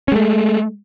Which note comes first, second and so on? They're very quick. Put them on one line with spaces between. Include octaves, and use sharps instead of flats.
C#4 G#3 A3